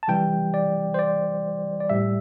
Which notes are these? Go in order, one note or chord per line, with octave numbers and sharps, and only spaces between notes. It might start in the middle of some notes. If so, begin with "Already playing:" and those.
A5
C3 E3 G3 G5
D5
C5
D5
D5
A2 G3 E5